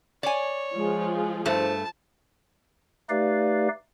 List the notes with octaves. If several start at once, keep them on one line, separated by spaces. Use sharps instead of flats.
C#5 D5 G#5
F3 G#3 F4 G#4
G2 A3 C5 A5
A3 D#4 G4 B4 D5 F5